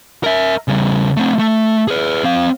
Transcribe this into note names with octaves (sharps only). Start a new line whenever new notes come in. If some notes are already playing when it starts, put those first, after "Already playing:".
A#4 E5
C#3 G3
A3 C4
A3
G#4 B4
C4 F5